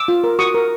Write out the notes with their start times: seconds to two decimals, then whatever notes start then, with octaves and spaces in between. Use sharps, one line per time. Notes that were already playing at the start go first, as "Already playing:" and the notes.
Already playing: D6 E6
0.08 F4
0.24 A#4
0.39 F#4 C#6 D#6
0.54 A#4